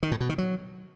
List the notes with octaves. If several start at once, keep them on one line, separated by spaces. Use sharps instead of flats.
D#3
A2
B2
D#3
F#3